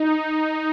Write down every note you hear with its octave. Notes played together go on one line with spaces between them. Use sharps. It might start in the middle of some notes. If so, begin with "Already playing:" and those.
Already playing: D#4